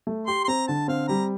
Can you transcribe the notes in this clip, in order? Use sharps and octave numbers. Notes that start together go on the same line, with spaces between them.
A3
G4 C6
C6
C4 A#5
D3 A5
C4 F5
G3 A#5